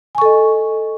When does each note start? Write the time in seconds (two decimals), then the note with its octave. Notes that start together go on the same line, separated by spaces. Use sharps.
0.15 G#5
0.18 C#6
0.22 A4
0.25 D#5